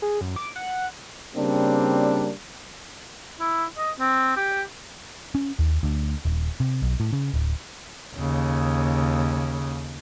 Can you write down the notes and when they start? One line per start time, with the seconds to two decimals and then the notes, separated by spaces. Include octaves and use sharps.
0.02 G#4
0.21 F#2
0.36 D6
0.56 F#5
1.35 C#3 G3 A#3 C4 D4
3.40 E4
3.78 D#5
4.00 C4
4.37 G4
5.35 C#4
5.59 D#2
5.83 D2
6.25 D#1
6.60 C3
6.82 B1
7.00 A2
7.13 C#3
7.34 D1
8.15 D#2 C#3